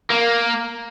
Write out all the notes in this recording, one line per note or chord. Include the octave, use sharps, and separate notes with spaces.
A#3